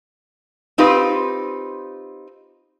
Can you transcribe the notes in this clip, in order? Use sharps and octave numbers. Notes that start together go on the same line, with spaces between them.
C4 D#4 F4 G4 B4